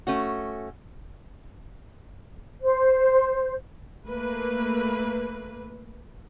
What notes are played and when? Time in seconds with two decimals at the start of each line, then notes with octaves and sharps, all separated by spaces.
0.07 A3 C#4 F#4
2.62 C5
4.07 A3 A#3 B4